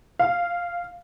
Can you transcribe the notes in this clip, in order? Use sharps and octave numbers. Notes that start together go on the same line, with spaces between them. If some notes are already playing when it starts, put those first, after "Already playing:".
F5